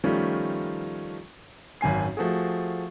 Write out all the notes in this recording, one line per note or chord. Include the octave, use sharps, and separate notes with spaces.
D#3 F3 G3 A3 C#4 F4
G#1 F#2 G#5 C7
F3 A3 F#4 G#4